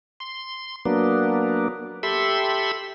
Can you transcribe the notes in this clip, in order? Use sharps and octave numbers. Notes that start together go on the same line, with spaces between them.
C6
F#3 A#3 B3 D4
G4 A4 E5 B5 C6